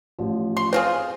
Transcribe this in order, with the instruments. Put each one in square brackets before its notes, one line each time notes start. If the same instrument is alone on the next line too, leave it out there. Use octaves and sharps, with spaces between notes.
[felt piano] A1 F3
[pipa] C6
[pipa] C4 F4 G#4 [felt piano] C5